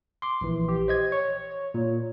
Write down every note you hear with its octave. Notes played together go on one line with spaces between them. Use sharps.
C6 D6
A#1 E3
G4
C5 D#5 G#6
C#5 C#6
A#2